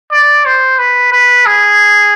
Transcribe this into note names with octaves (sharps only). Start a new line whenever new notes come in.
D5
C5
B4
B4
G#4